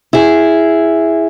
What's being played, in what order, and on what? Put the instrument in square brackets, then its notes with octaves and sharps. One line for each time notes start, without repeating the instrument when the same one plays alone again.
[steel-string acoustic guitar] E4 G#4